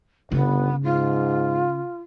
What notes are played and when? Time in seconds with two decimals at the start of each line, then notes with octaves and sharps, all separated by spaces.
0.32 G1 C#3 B3
0.83 G#2 F4